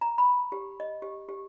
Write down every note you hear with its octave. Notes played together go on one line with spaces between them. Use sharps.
A#5
B5
G4
D#5
G4
G4